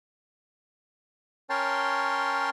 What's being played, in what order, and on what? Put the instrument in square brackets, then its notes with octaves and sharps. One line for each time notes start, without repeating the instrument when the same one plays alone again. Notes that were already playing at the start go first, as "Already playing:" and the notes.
[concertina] C#4 A#4 C#5 G5 A5 C6